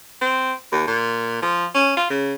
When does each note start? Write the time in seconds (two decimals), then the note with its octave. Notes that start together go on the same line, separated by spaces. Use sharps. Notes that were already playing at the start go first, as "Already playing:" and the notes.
0.21 C4
0.72 D#2
0.87 A#2
1.42 F3
1.74 C#4
1.97 F4
2.10 C#3